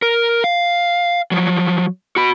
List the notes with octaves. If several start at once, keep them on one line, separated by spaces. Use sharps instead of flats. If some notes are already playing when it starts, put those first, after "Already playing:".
A#4
F5
F3 F#3
F#4 B5